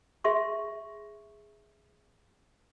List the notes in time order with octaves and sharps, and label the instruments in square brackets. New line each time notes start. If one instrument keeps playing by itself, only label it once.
[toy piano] G#4 E5 C6 C#6